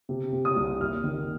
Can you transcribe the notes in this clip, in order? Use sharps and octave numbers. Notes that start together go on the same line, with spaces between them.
C3
C3
D#6
C2
D#2 F6
D#3